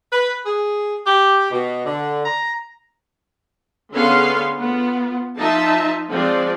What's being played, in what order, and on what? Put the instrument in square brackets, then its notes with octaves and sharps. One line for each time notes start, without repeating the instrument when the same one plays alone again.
[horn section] B4
G#4
G4
B2
D3
A#5
[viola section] D3 B3 C#4 G#4 F5 C6
B3 F4
F3 D#4 F4 E5 A5
F3 G#3 C4 D5